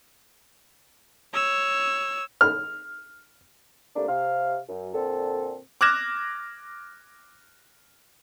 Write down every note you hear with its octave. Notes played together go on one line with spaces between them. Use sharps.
C#5 E6
F6
C3 G3 A3 A#3 D4
C3 F5
F#2
A#2 D3 C4 A4
D6 F6 F#6 G#6 A#6 E7